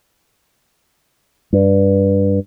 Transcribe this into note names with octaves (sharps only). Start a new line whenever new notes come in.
G2